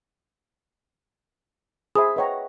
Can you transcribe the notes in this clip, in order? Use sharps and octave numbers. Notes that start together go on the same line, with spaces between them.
G#4 C5 E5 B5 D#6
B4 C#5 D#5 F#5 G5 A#5